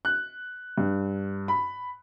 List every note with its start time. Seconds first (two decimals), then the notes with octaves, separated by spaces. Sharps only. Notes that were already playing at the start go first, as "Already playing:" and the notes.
0.05 F#6
0.78 G2
1.48 B5